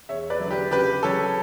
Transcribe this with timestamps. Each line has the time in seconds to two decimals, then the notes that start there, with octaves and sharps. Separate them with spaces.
0.09 E2 C#5 E5
0.30 B4 D5
0.40 D3 F#3
0.51 G4 B4
0.71 C#3 G4 B4
1.03 F#3 C#4 A4 C#5